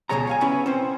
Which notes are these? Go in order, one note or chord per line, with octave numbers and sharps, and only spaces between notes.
C#2 B2 D#3 G#4 C#5 A#5
C#5 F5 G#5
B3 C#4 E4 C#5 B5
C4 C#4 C5